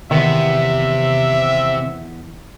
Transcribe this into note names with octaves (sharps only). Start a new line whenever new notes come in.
E2 C3 D#3 B3 E5